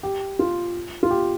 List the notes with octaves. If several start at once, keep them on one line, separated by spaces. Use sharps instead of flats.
G4
F4
F4
G4